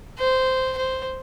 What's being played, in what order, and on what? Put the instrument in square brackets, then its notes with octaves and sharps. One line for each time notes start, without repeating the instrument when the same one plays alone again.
[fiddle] C5
C5